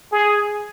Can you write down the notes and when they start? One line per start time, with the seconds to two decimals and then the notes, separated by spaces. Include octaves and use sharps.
0.12 G#4